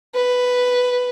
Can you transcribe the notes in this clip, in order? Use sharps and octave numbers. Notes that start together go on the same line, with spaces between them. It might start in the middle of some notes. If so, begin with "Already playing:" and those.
B4